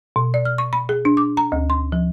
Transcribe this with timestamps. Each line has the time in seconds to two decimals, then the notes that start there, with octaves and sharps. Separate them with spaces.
0.16 B2
0.34 D5
0.45 F6
0.58 C#6
0.73 B5
0.89 G#4
1.05 D4
1.17 D6
1.37 A#5
1.52 D2
1.70 C6
1.92 F3